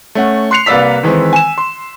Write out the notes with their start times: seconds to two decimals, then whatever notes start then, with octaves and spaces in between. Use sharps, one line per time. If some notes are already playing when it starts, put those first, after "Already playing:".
0.15 A3 C#4 F#5
0.51 C6 F#6 C7 C#7 F7
0.66 C2 A#3 B4 D5 E6 B6
1.03 D#3 E3 G#3 C4
1.33 G#5 E7
1.58 C6